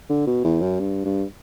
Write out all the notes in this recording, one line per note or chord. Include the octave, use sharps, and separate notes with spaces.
D3
B2
E2
F#2
G2
G2